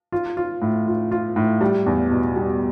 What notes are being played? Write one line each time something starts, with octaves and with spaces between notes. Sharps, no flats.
F4
F4
A2
F4
F4
A2
G3
E2
B2
G3